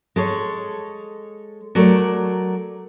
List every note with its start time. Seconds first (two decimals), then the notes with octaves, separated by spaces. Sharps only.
0.16 G#3 A4 C#5
1.75 F#3 A3 A#4 D5